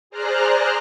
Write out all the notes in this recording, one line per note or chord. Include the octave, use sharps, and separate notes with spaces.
G#4 C5 D5 A#5 F6 F#6